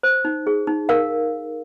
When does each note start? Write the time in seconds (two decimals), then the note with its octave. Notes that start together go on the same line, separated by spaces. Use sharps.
0.03 C5
0.25 D#4
0.47 G#4
0.67 D#4
0.89 A#4 F5